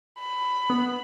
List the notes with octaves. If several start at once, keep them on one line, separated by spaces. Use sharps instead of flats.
B5
B3